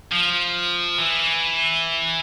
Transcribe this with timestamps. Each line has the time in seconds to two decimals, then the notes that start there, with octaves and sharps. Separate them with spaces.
0.12 F3
0.99 E3